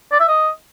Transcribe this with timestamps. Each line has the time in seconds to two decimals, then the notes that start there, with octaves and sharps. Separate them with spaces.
0.12 D5
0.20 E5
0.28 D#5